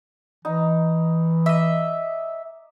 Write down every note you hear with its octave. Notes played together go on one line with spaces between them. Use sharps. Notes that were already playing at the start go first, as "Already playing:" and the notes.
E3 D#4 A#5
D#5 E5 D6 E6